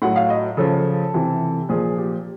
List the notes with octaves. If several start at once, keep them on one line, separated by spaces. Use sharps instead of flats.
A2 F#3 F#5
F5
D#5
C#3 F3 A4
C3 E3
A#2 F3 G#4
G4